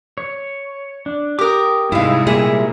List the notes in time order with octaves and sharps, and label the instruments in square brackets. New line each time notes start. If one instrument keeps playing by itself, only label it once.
[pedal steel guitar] C#5
D4
[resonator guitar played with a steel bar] G4 A#4 [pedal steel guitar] D6 D#6
[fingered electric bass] G#2 [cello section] C3 G3 G#3 [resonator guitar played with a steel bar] E4 F5
[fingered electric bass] A#2 [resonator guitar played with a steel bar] E4 G#4 E5